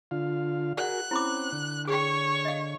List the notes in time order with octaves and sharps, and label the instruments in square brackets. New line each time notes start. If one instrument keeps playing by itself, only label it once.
[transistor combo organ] D3 F4 F5
[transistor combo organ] F#4 G#4 A#4 [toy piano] D5 F#5 [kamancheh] F#6
[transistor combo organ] C4 C#4 [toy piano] E4 B5 D6
[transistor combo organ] D3
[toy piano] G#4 G5 [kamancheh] C#5 C#6
[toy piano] D#5 F5